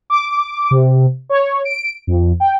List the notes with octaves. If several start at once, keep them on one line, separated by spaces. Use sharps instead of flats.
D6
C3
C#5
D7
F2
G5